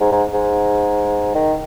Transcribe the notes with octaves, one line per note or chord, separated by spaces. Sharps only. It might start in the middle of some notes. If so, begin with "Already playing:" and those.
G#2
G#2
G#2
D#3